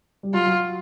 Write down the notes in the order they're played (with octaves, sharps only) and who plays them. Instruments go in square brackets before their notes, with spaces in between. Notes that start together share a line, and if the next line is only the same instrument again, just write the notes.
[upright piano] G3
[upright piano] F#3 [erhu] F4
[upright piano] F#3